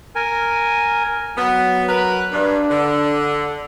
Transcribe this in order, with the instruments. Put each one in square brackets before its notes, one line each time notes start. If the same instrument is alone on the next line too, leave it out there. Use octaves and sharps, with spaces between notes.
[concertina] A#4 G#5
[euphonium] F#3 [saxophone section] B3
[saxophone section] A#4 B4
[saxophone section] G2 [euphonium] D4
[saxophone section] D3